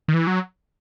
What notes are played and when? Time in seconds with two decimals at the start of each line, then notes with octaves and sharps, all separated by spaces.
0.08 D#3
0.14 E3
0.27 F#3